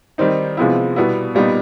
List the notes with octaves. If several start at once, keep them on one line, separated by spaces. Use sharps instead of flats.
D#3 G3 C4 D#4
C3 F3 G#3 B3 E4
B2 G3 B3 E4
A#2 G3 B3 D#4